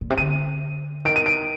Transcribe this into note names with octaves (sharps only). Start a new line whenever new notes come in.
A#2
C3
D3 D#7
D#3 D7
D#7
D7